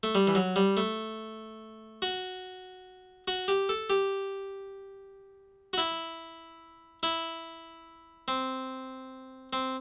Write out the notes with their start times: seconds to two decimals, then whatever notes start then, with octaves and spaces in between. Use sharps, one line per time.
0.03 A3
0.15 G3
0.27 E3
0.35 F#3
0.56 G3
0.77 A3
2.02 F#4
3.28 F#4
3.48 G4
3.69 A4
3.90 G4
5.73 F#4
5.78 E4
7.03 E4
8.28 C4
9.53 C4